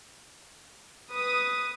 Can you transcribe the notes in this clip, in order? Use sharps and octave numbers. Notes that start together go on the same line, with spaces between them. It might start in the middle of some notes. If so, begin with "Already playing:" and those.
B4 D#6